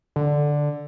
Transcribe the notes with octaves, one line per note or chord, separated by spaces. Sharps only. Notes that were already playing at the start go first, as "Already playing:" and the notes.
D3